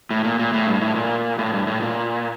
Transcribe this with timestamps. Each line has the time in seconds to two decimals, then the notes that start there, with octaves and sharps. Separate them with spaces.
0.10 A2
0.24 A#2
0.39 A#2
0.54 A2
0.67 G2
0.81 A2
0.95 A#2
1.39 A2
1.53 G2
1.67 A2
1.82 A#2